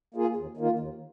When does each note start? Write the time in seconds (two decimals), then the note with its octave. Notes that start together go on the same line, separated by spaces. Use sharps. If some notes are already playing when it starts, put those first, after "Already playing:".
0.14 A#3 F4 G#4
0.37 D#2
0.57 D#3 A#3 F4
0.79 D#2